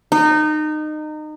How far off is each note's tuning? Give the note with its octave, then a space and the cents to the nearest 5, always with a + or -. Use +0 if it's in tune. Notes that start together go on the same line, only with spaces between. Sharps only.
D#4 -25